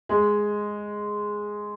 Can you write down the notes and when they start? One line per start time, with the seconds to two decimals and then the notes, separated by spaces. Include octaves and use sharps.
0.09 G#3